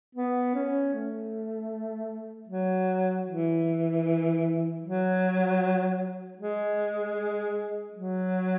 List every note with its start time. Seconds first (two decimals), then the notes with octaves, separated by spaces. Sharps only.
0.15 B3
0.55 C#4
0.94 A3
2.49 F#3
3.27 E3
4.82 F#3
6.38 G#3
7.94 F#3